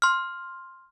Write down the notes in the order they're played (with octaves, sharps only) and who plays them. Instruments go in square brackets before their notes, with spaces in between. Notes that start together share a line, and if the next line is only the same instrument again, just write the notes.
[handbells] C6 F6